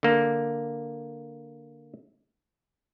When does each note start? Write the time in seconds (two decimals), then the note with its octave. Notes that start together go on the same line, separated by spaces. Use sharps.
0.03 D3 A#3